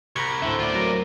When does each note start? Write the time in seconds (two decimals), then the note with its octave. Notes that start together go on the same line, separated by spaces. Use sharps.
0.16 C2 A#5 B5 C#6 G#6
0.42 D2 A2 D3 C4 E5
0.59 F4 D5
0.75 F#3 A#4